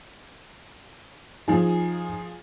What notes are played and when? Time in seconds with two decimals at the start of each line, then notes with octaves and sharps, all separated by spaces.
1.48 F3 D#4 G#4